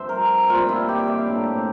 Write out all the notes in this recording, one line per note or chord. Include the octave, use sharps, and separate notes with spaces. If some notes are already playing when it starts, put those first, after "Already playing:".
Already playing: G2 F3 C4 C5 E5
A#4
A#2 G3 C4 F4
E4
G4
D5
E5
F5
A2 G3 A#3 D4